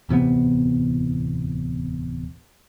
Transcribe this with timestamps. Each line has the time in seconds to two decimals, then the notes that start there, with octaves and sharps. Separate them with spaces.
0.09 D1 E2 C3 B3